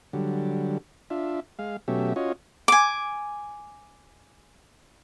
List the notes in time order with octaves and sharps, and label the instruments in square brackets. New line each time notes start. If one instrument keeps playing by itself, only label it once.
[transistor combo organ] D3 F#3 G3
D4 F4 E5
G#3 F5
B2 F#3 A3 C#4 G4 E5
C#4 F4 F#4 C#5 D#5
[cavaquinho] G#5 D6